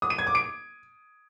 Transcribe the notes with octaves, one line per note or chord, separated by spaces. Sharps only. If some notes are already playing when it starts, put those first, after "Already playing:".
D#6
D#7
G#6
D6
D7